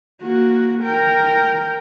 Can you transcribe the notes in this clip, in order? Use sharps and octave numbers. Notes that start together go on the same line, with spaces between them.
A#3 F#4
A#4 G5